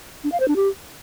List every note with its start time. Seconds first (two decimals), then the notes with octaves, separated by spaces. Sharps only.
0.24 D4
0.32 F5
0.40 C5
0.48 D4
0.56 G4